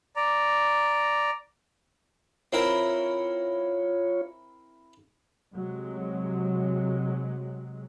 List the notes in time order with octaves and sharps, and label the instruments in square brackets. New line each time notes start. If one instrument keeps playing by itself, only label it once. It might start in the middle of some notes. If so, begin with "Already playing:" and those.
[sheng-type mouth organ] D5 A#5
[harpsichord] C4 E4 A#4 [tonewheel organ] F4 C#5
[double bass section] C3 F#3 G#3